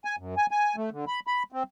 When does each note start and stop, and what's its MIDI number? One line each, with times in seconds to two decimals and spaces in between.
0.05 0.16 80
0.18 0.35 42
0.37 0.46 80
0.51 0.76 80
0.76 0.90 57
0.92 1.05 50
1.08 1.20 83
1.27 1.43 83
1.52 1.63 60